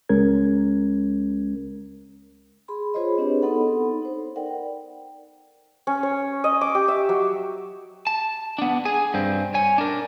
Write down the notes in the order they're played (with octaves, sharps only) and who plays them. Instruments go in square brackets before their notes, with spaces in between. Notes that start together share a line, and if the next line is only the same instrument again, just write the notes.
[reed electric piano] C#2 G#3 C#4 A#4 G#6
[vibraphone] G#4 B5 C6
F4 G#4 C5 C#5 D#5 B5
C4 D4 G4 G#4 B4 C#5
B3 D#4 A4 F#5 B5 C6
D#4 C5
A#4 D5 F#5 G5
[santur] C#4
C#5
D#5
D6
G4
E5
F#3
[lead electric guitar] A5
B3 D4
G#4 G#5
G2 C4
C#5 G#5
D4 A#4